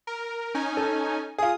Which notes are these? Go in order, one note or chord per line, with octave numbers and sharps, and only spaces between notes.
A#4
C#4 D#4 G#5
A4
F4 G#4 D#6